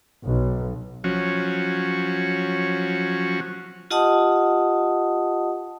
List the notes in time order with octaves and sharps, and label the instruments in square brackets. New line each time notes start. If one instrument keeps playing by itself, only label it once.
[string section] B1
[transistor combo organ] F3 F#3 C#4 F#4
[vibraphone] F4 G4 D#5 F#5 A5 D#6